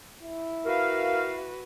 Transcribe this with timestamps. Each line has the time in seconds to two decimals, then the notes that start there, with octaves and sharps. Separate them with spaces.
0.22 E4
0.66 F#4 A#4 B4 F5